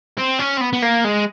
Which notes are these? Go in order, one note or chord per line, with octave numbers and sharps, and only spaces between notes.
C4
C#4
C4
B3
B3
A#3
G#3